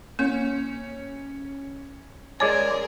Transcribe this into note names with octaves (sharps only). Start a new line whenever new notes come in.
A#3 C#4
G#3 G#4 A#4 C#5 D5 G#5